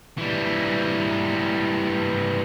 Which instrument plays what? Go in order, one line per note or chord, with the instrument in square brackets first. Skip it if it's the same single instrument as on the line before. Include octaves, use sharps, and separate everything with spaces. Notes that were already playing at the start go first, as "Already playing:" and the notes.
[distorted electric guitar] E3 G3